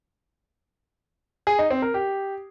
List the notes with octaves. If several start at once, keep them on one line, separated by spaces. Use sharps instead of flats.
G#4
D#4
C4
A#4
G4